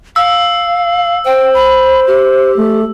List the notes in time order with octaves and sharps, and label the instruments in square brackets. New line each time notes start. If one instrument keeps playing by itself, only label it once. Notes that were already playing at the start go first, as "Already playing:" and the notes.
[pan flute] F5 [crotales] E6
[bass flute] C5 [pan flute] G5
[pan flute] B5
G4
[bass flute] A3